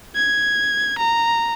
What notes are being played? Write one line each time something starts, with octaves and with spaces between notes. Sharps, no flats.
G#6
A#5